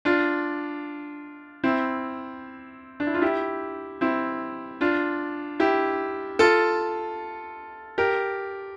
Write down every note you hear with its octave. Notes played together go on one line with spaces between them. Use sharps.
D4 F4
C4 E4
D4
E4
F4
E4 G4
C4 E4
D4 F4
E4 G4
F4 A4
G4 A#4